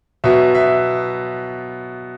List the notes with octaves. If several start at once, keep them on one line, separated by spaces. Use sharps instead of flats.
B2 F#3 B3 E5
E5